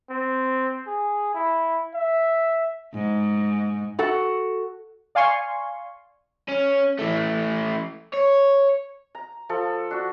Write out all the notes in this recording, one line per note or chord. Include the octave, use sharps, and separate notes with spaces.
C4
G#4
E4
E5
G#2
F#4 A4 F#5
D5 F5 G#5 C6 C#6
C#4
E3 A3
C#5
A#5
F3 A4
D4 F#4